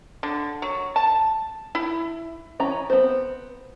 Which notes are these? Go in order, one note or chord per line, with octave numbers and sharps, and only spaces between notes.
D3
F#3
A5
E4
E3 C#4 A#5
B3 C4 C5